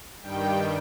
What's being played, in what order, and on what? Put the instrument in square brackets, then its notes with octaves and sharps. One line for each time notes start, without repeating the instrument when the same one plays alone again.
[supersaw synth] G2 D#3 G3 G5